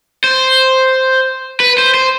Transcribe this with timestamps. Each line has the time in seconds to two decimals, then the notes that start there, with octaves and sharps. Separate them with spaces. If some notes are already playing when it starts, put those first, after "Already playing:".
0.24 C5
1.60 B4
1.78 C5
1.94 C5